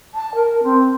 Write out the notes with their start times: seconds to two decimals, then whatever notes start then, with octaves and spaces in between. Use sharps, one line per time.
0.14 A5
0.34 A#4
0.63 C4